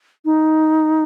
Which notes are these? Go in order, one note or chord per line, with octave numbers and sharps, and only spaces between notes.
D#4